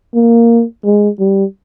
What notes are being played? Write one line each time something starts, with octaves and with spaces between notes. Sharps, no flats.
A#3
G#3
G3